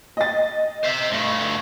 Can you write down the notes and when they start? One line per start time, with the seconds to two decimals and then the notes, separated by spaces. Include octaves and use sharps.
0.17 D#5 A6
0.84 C5 E5
1.12 G2 A3